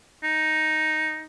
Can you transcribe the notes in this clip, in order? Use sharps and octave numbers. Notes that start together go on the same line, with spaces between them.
D#4